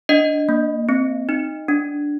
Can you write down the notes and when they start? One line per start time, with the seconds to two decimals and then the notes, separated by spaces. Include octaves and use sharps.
0.09 D4 D#5
0.49 A#3
0.89 C4
1.29 D#4
1.69 D4